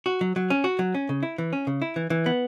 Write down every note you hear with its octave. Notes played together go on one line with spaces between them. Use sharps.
F#4
F#3
F#3
C#4
F#4
F#3
C#4
C#3
E4
E3
C#4
C#3
E4
E3
E3
B3